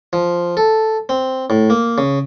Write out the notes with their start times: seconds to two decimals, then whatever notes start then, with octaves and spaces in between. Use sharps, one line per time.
0.13 F3
0.57 A4
1.09 C4
1.50 A2
1.70 A#3
1.98 C#3